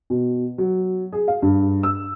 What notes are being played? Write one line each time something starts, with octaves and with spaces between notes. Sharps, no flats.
B2
F#3
G#4
F5
G2
E6